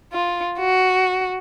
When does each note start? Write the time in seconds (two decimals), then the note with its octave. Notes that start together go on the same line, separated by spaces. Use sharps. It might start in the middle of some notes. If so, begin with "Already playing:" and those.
0.13 F4
0.59 F#4